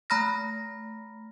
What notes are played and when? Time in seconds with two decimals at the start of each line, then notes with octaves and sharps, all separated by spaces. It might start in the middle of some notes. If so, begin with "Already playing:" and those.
0.10 A3 A#5 B5 F6 A#6